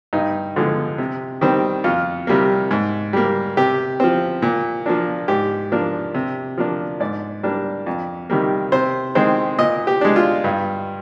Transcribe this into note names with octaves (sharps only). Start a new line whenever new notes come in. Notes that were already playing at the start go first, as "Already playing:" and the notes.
G2 D#4
D3 F3 G#3
C3
D#3 G3 C4
F2 F4
C3 G3 A#3
G#2
G3 A#3
C3 G4
F3 C4
A#2
F3 A#3 D4
G#2 G4
F3 A#3 D4
C3
F3 A#3 D4
G#2 D5
G3 A#3 D4
F2
C3 D#3 G3 A#3
C3 C5
D#3 G#3 C4 C5
A#2 D#5
G4
G#3 D4
F4
G2